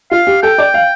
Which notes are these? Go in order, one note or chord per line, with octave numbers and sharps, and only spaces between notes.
F4 F5
G4
A4 G5
D5
F5